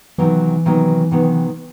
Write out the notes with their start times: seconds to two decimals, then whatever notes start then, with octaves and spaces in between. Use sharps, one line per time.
0.18 C3 D#3 E3 F#3 B3
0.65 C3 D#3 F#3 B3
1.11 C3 D#3 F#3 B3